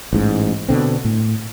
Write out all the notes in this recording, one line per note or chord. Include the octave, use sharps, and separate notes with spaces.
A1 G#2
B2 D3 C4
A2